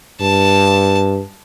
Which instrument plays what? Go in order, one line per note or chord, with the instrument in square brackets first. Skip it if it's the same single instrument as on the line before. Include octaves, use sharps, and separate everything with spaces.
[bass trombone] G2 [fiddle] A5